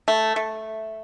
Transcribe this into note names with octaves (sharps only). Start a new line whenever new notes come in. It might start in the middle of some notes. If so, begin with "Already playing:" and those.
A3
A3